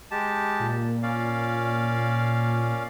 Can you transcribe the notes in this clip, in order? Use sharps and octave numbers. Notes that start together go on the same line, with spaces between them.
G#3 G4 A5
A#2
C#4 D5 F5